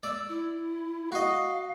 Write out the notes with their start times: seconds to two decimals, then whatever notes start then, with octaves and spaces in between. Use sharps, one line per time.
0.03 D5 E6
0.29 E4
1.12 F#4 D#5 F5